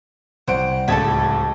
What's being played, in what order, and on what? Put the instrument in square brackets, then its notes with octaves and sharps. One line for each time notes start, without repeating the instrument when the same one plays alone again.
[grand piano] C2 C5 D7 [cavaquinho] F#5
[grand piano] D1 C#2 G#6 [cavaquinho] A4 A5 B5